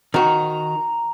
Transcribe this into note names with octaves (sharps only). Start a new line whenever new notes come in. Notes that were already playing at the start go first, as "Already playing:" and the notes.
D#3 F#4 A#5